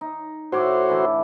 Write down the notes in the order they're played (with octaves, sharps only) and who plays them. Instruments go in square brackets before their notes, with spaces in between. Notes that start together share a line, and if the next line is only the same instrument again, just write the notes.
[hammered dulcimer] D#4
[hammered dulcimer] A2 C#5 D6 [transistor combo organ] F#4 C5
[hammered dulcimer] D3 E3